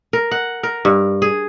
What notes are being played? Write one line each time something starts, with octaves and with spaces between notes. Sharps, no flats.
A#4
F#5
A#4
G2
G#4